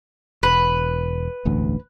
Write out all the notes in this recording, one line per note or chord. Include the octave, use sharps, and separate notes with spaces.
E1 B4
E1 A1 D2